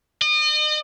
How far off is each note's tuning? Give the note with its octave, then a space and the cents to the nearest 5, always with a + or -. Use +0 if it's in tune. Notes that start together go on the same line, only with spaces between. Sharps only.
D#5 -40